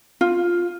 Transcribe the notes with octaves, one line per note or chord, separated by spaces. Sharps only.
F4